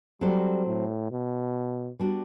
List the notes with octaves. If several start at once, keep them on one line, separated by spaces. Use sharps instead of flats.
F#3 G3 C4 F#4 A4 C5
A2
B2
G3 B3 D4 F#4